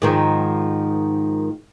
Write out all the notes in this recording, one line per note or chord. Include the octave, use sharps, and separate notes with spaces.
G#2 D#3 F3